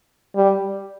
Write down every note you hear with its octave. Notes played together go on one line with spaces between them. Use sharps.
G3